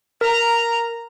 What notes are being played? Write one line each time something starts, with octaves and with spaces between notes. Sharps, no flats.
A#4 A#5